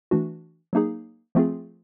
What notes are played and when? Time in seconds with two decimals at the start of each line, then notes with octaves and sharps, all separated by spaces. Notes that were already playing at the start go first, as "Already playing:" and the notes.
0.11 E3 A3 D4 F#4
0.73 F#3 A#3 D#4 G#4
1.35 F3 A3 C4 F4 G#4